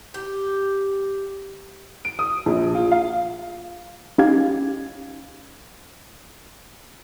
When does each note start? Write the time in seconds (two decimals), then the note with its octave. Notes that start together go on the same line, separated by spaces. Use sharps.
0.14 G4
2.05 D7
2.19 D#6
2.46 A#1
2.75 F4
2.92 F5
4.18 C#4 D#4 G4 F5 G#6